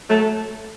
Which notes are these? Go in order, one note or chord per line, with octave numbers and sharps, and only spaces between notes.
F#3 A3